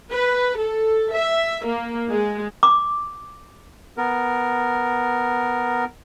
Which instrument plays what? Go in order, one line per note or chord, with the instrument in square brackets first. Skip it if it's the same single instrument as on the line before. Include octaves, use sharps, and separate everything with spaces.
[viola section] B4
A4
E5
A#3
G#3
[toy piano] D6
[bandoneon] B3 A#4